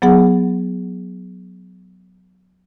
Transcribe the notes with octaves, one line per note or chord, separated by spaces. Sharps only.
F#3 B3 G#4 F#5